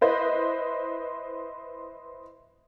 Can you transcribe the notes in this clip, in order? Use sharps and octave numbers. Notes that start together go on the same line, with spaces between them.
E4 B4 C5 D#5